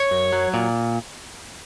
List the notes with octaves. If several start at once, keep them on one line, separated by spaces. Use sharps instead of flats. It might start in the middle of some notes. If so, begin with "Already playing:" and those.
Already playing: C#5
F#2
F#3
A#2